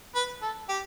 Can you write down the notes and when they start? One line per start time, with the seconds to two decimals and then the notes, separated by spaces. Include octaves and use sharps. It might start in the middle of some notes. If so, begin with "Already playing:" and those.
0.15 B4
0.42 A4
0.69 G4